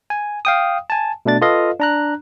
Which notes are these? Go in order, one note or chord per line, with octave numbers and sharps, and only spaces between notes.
G#5
F5 G5 D#6
G#5 A5
B2 A3 D4 A6
F4 A4 B4 D#5 F5
D4 A#5 F#6